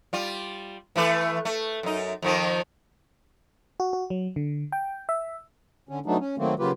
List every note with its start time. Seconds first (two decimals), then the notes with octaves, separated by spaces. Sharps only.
0.13 G3 F4
0.96 E3 A3 B4
1.45 A3
1.83 F#2 D#4
2.22 F2 D#3 F3
3.80 F#4
3.93 F#4
4.10 F#3
4.36 D3
4.72 G5
5.09 E5
5.89 D3 C#4
6.06 F#3 A3 B3 D4 D#4
6.19 C#4
6.38 D#3 F#3 A3 A#3 C4
6.59 C#3 F#3 A#3 F4 G4 B4